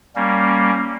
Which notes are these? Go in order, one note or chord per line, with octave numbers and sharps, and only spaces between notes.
G3 A#3 C#4